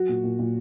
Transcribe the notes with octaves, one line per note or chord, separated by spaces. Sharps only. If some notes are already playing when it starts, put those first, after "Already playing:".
Already playing: F#3 F#4
A#2
A#2
A#2